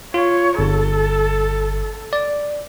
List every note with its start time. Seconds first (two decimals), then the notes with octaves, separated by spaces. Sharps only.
0.14 F4 C#5
0.59 G1 A4
2.13 D5